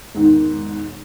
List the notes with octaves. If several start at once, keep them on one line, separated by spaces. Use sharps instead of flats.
E1 G#2 D#3